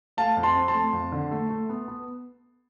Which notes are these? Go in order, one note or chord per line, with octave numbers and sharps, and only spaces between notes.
A3 F5 A5
F2
A5 C6
C4
A5 C6
A3
F2
D3
A3
A3
B3
B3